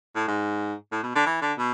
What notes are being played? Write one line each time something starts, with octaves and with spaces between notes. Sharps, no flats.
A2
G#2
A2
B2
D3
E3
D3
B2